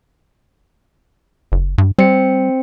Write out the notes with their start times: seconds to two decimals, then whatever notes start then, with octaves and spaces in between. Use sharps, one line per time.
1.52 F#1
1.78 G2
1.98 G3 C4 C#7